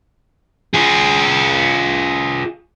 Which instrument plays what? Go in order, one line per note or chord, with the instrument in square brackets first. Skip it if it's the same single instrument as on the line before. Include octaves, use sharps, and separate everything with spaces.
[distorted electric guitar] F4 G#4